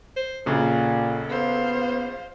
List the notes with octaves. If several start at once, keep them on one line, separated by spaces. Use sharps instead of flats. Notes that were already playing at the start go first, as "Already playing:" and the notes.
C5
A#1 A#2 C#3 A4
B3 C5 F5